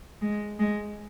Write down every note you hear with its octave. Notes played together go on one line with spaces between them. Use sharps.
G#3
G#3